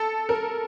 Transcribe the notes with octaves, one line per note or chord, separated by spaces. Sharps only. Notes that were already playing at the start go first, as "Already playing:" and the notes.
Already playing: A4
A#4